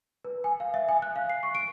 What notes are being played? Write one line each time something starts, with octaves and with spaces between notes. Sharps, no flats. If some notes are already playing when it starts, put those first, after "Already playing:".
B4
G#5
F5
E5
G#5
F#6
F5
C7
C#6
D7